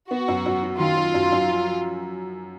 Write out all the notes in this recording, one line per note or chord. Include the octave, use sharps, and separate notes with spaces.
B3 F#4
F#2
F#2
F#3
D#3 F4
F#3
F#2
F#2
F3
F3